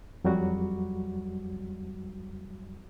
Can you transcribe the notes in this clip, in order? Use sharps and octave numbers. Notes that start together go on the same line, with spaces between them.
F2 F#3 G3 F#4